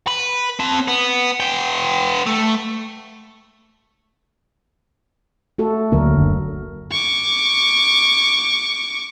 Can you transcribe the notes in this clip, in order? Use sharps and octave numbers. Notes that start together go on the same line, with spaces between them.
B4
C4 A5
B3
B3 G5
A3
A3 F#4 A4
D2 D3 F#3 A#3 A#4
F#1 F#2 D3
C#6 D6